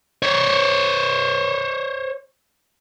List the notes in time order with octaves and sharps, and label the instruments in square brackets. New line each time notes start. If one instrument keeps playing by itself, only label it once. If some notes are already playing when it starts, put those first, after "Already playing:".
[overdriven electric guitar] C5 C#5